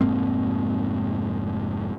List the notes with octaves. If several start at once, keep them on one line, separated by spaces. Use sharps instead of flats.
F1 G#2 A#3 C4